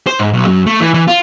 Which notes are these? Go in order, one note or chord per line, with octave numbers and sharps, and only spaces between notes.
C5
G#2
B1
F#2
A3
E3
E3
F4